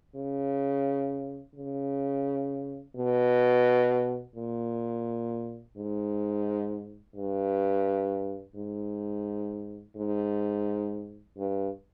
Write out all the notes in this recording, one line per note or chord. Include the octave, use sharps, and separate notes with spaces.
C#3
C#3
B2
A#2
G#2
G2
G#2
G#2
G2